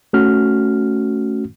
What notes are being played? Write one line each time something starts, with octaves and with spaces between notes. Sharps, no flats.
A3 C#4 F#4 F6